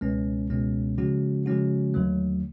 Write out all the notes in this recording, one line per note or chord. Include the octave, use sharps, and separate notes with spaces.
C#2 B2 G#3 C#4
C#2 B2 G#3 C#4
C#3 F3 G#3 C#4 F#4
C#3 F3 G#3 C#4 F#4
D#2 D3 F#3 A3